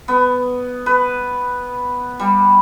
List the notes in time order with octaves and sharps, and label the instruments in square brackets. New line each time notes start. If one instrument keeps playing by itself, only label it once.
[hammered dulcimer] B3
B4
G3